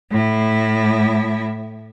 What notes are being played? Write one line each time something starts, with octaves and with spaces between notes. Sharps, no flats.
A2 E4